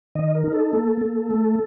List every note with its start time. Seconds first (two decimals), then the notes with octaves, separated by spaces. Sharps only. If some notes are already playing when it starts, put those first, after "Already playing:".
0.15 D#3 D#5
0.35 A#4
0.44 D#4
0.53 A4
0.73 A#3
1.01 A#3
1.31 A3